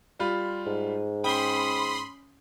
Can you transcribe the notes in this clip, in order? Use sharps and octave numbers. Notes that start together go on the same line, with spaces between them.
G3 F4 B5
G#2
C#4 G5 B5 C6 D#6 G7